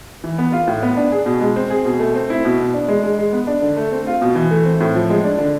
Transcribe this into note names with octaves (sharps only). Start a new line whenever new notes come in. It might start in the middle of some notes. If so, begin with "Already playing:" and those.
E3
B3
F4
A2
B3
D4
G#4
B2
G#3
C4
G#4
B2
A3
C4
E4
B2
B3
D4
G#3
G#3
G#3
B3
D4
D3
A3
C4
F4
B2
E3
A3
C4
A2
F3
G#3
D4
D3